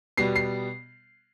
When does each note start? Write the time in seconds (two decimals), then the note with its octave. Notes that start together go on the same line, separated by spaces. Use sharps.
0.18 B2 G3 B3 C7
0.36 C7